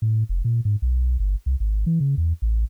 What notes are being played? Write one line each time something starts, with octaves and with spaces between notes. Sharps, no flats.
A2
F1
A#2
G#2
B1
G1
C2
G#1
E3
C#3
E2
A1